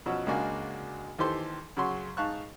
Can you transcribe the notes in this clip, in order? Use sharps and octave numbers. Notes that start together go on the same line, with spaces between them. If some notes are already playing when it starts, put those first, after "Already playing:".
F#2 B2 F3 F#3
C#2 G#3 A#3 D4 F#4 G#5
D#2 E3 G4 A4 C5 C6
F#2 C#3 F#3 C6
G#2 F5 A5 C#6 F#6